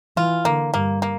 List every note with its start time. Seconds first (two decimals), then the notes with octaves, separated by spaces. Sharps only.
0.17 E3 F4
0.45 D3 A#3
0.74 G2 A#3
1.02 A#3